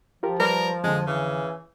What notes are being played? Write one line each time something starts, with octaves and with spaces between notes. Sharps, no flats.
F3 F4 G4 A#4
G3 A#4 B4 D5
F2 D3 G#3
C#3 E3